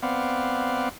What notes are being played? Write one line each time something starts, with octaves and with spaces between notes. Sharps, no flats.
B3 C4 D5 F5 F#5